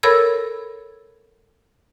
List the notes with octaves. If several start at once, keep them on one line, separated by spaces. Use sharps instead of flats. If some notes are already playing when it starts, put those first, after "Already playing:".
A4 A#4 C#5 B5 E6 G#6